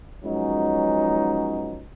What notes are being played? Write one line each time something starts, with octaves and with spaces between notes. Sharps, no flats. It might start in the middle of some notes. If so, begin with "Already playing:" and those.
F3 F#3 G#3 B3 C#4 D#4